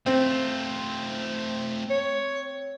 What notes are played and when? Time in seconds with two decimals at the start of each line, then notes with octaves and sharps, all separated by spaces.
0.06 A3 C4 F4
1.90 C#5